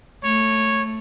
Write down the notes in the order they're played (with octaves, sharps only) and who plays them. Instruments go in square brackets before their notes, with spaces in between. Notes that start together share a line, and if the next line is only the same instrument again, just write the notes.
[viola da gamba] A3 [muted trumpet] C#5